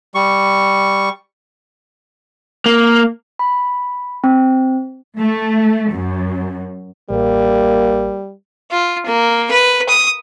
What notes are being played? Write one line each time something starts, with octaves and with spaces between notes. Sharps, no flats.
G3 C#6
A#3
B5
C4
A3
F#2
A1 G3 A#3
F4
A#3
B4
D#6